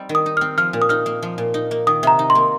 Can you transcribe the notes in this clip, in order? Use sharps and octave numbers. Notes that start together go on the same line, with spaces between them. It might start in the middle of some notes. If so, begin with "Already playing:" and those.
Already playing: G3 C4 D#4
D#3
D#6
D#4
C4 F6
F3 F6
A#2
D#6
D#4 F6
A#3
F3
A#2
D#4
A#3
D#3 D#6
C3 A#5
D#4
C6
A#3